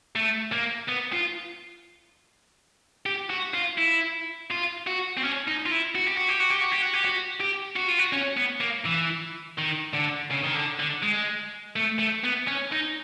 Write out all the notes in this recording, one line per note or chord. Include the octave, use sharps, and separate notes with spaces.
A3
A#3
B3
F4
G4
F#4
F4
E4
F4
F#4
C4
C#4
D#4
F4
E4
F#4
G4
F#4
G4
F#4
G4
F#4
G4
F#4
G4
F#4
G4
F#4
F4
F#4
C#4
B3
A#3
E3
D#3
D3
C#3
D#3
D3
D3
G#3
A3
A3
B3
C#4
D#4